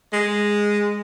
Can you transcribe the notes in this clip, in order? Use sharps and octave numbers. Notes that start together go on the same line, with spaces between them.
G#3